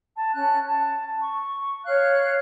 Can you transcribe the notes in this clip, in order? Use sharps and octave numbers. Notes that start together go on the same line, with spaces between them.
A5
C#4 A5 F#6
A5
C#6
C#5 F5 F6 F#6